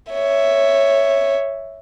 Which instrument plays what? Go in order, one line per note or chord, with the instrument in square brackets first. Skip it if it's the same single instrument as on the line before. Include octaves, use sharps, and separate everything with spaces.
[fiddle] C#5 E5